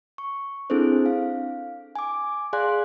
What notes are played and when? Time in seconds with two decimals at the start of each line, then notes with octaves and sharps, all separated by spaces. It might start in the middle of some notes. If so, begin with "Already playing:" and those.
0.18 C#6
0.70 C4 D4 E4 G#4 A4 C5
1.06 F5
1.96 G#5 D6
2.53 G#4 D5 F5 G#5 C6 F#6